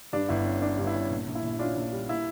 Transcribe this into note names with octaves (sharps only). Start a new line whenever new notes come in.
G2 D4
G1 E4
C#4
C#4 D4
G2
E4
C#4
A#1
A#1
E4
A#1
C#4 D4 F4
A#1
G3
A#3 E4